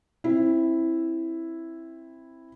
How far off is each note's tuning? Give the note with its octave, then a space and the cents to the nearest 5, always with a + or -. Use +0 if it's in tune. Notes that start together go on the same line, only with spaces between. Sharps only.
C4 +20 E4 +0